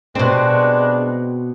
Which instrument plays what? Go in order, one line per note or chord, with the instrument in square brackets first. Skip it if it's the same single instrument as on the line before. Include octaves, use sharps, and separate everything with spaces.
[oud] B2 C4 [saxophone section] G3 G#3 D4